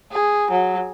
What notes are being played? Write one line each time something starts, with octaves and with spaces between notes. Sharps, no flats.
G#4
F#3